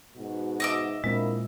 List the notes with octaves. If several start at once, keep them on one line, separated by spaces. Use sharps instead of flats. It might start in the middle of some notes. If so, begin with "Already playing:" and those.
G#2 B2 F#4
D#5 E5 D6
A#2 G#3 A#3 C4 D4 E4